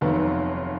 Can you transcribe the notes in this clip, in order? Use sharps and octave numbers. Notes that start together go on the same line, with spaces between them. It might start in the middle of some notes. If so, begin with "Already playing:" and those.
F1 D#2 D#3 F#3 B3